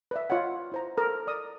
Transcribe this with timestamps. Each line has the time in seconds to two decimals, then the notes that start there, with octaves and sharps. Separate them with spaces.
0.11 B4 D5 E5
0.30 F4 C#5 D#5 F#5
0.72 E4 C5 A#5
0.97 A4 A#4 A#5
1.27 D5 D#6